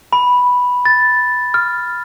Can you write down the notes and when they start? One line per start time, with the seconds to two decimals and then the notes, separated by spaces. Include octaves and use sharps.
0.13 B5
0.85 A6
1.54 F6